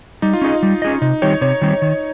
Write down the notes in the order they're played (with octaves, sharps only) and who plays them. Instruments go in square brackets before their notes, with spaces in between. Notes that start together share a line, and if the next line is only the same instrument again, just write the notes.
[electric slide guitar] G3 [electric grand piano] D#4
[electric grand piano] F4
[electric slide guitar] C#4 G#4 D#5 [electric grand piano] D#4
[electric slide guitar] G3
C#4 G#4 D#5
[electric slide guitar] C3 [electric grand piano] D#4
[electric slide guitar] D#3 G3 C4 G4 [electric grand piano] C#5
[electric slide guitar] C3 [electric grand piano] C#5
[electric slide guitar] D#3 G3 C4 G4
D#3